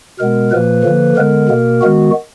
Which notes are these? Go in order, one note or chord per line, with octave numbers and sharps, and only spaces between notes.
B2 G#3 B3 A#4
A#2 F3 A#3 B4
D3 F3 A#3
D3 G#3 B3 A#4
B2 A#3
D#3 G#3 B3 F#4